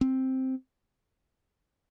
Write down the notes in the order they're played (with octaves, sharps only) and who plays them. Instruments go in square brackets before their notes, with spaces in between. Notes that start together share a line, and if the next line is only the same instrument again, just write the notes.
[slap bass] C4